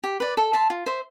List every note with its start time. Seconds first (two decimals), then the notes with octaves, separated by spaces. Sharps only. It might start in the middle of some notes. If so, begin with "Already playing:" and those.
0.04 G4
0.20 B4 D5
0.37 A4
0.53 E5 A5 C6
0.70 F4
0.86 C5 E5